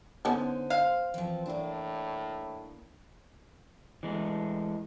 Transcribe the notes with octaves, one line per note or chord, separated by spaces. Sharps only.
D3 B3 C#4 D#4 A4 C5
F5
E3 F3 C4
A2 A#3 D4
E3 G#3 A3